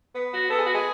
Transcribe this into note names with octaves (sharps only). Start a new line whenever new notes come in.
B3
F#4
B3 A4
G#4
F#4
G#4